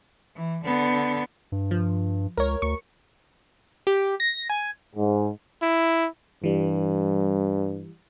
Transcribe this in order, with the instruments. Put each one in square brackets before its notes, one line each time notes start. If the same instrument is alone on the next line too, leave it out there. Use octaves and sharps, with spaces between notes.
[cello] E3
D3 B3
[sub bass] G2
[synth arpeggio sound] F3
[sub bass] C#2 [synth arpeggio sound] A#4 C#5
[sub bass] D2 [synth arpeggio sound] C#6
[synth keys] G4
A#6
G#5
[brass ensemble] G#2
[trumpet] E4
[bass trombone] G2 [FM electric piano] E3 G3